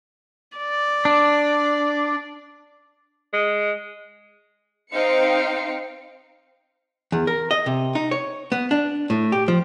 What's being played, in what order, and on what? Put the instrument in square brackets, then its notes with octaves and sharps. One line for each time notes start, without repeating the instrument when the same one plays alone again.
[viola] D5
[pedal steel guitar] D4
[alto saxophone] G#3
[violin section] C4 D#4 C5 F5 G5 C#7
[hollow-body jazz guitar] E2
A#4
D#5
C3
D#4
C#5
B3
D4
A2
G4
F3